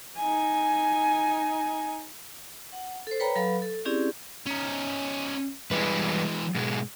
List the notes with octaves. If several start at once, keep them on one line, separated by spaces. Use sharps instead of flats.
D#4 G#5
F#5
A4 C5
B4 C#5 G5 A#5 B5
F#3 A4 B4 F5 B5
A4
C4 C#4 E4 G4 G#4 D5
C#4 D#4
E2 E3 G3 G#3 B4
G#2 B2 G#3